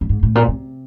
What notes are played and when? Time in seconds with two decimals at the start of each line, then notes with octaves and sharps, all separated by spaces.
0.01 G2
0.09 G#2
0.23 A2
0.35 A#2
0.48 C3